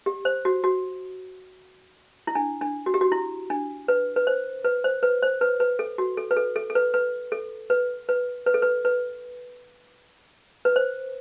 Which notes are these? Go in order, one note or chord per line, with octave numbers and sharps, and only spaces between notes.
G4
C5
F#4
F#4
E4
D4
D4
F#4
G4
F#4
E4
D4
B4
B4
C5
B4
C5
B4
C5
B4
B4
A4
F#4
A4
B4
A4
A4
A4
B4
B4
A4
B4
B4
B4
A4
B4
B4
B4
C5